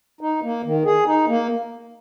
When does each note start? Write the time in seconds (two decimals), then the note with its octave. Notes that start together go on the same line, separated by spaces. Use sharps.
0.21 D#4
0.43 A#3
0.64 D#3
0.85 G#4
1.06 D#4
1.28 A#3